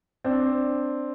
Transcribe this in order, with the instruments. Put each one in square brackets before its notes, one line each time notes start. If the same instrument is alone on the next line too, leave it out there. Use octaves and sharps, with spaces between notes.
[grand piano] C4 D4